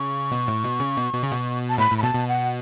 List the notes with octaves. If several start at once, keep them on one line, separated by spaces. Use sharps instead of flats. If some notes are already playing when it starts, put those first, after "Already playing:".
Already playing: C#3 C#6
B2
A2
B2
C#3
B2
B2
C#3
B2
A5
A2 B5
A2
B5
B2 A5
B2
F#5